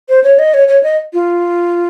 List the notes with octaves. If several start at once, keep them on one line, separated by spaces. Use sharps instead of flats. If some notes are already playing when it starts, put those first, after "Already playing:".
C5
C#5
D#5
C#5
C#5
D#5
F4